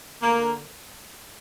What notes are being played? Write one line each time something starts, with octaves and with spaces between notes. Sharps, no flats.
D2 A#3
D3